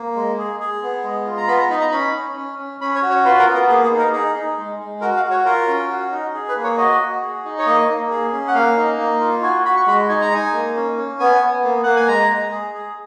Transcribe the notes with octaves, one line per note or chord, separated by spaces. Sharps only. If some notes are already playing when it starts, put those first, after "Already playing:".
Already playing: A#3
G#3
G#4
G#4
B3
G#3
F4
A#5
B3 B5
A#5
D#4 B5
A#5
C#4 B5
C#4
C#4
C#4
C#4 B5
C#5
F#4
C#5
F4 B4
A#4
B3
A#4
A#3 G#4
G#4
D#4
A#4
D#4 G#4
D#4
G#3
G#3
F#4 A#4
F5
F#4
C#5
F4 A#4
C#4
F#4
D#4
G#4
B4
A#3
C#5
F#4 D#5
F#4
G#4
D#4
C#5
A#3 D#5
A#3
G#4
C#4
F#5
A#3 F5
D#4
A#3
F4
F#4 G#5
F#4 B5
C#6
G#3 B5
D#4 G#5
A#5
D#4 G#5
A#3
C#4
C#4
B3 G#5
B3
A#3
A#3 F#5
G#5
G#3 A#5
G#3
G#4
G#4